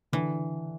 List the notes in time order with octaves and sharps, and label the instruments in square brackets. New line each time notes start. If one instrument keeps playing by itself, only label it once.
[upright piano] D3 [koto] E3